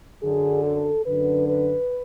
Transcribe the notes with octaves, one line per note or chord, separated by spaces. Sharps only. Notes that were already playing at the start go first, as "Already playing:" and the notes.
F#2 D3 G#4
A4
F#2 D3 B4
B4